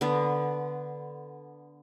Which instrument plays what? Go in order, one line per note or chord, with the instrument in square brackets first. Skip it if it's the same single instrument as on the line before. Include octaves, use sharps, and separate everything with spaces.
[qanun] D3 B3